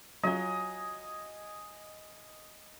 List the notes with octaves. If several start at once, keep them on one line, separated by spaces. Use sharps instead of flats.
F#3 F4 D#5 G#5